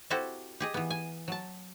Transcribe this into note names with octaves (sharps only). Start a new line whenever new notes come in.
C4 E4 F#4 G4 A4
G4 G#4 D#5
E3 B3
G#5
F#3 A5